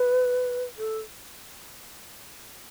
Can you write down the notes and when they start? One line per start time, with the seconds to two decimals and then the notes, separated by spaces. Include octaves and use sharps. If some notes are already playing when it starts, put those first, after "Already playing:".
Already playing: B4
0.78 A4